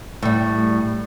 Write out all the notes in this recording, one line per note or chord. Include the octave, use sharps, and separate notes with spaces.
A2 G3